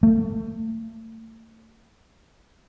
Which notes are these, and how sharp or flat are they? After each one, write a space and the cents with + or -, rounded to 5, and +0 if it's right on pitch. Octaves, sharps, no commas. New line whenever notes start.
A3 +35